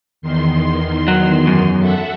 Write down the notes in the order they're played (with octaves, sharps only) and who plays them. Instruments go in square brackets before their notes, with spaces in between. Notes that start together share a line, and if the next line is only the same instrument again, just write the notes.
[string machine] E2 D#3 C6
[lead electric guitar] F#3
F#2
[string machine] A4 E5 F#5